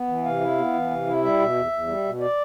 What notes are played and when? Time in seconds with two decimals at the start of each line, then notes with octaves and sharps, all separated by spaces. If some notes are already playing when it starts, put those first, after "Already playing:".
Already playing: B3
0.08 E3
0.24 C3 F5
0.41 E4
0.58 B3
0.73 E3
0.91 C3
1.07 E4
1.23 G3 E5
1.39 B2
1.55 E2
1.72 E2
1.88 G3
2.04 B2
2.20 D5